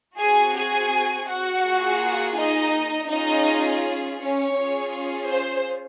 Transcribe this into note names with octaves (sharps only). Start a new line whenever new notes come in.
C4 F#4 G#4 G#5
G#4 G#5
F#4 F#5
A#3 F4 G#4
D#4 D#5
C#4 D#4 F4 G#4 D#5
C#4 C#5
C#4 F4 G#4
C5